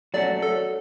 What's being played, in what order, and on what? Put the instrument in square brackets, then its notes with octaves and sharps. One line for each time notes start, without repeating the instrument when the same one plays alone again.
[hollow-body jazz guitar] F#3 A3 C#4 F#4 [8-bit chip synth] D5
[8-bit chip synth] A4